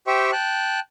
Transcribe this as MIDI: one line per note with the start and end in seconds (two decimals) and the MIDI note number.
0.07 0.31 67
0.07 0.31 72
0.07 0.31 76
0.07 0.31 79
0.07 0.31 85
0.32 0.80 79
0.32 0.80 81
0.32 0.80 90